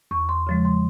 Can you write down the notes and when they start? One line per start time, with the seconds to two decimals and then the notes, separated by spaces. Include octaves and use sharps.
0.11 E2 C#6
0.29 C6
0.47 C#3 F3 G#3
0.65 C6